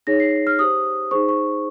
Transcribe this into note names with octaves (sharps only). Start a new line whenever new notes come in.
D#4 G#4 C#5 A#6
C7
F6
G4 C5 D#6
D#4 G#4 C5 C#6
C#6